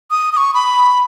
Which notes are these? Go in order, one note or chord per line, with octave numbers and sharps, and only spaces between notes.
D#6
D#6
C#6
B5